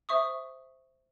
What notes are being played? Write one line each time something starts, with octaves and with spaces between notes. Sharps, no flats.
C5 E5 C#6 D#6